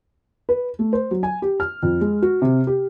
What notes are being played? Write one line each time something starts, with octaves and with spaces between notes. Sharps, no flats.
B4
A3
C5
F#3
G#5
G4
F6
F2
G#3
F#4
C3
G4